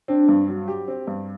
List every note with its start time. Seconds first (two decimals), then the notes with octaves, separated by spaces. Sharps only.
0.08 C4 D4
0.29 G2
0.48 F#3
0.68 G4
0.88 C4
1.07 G2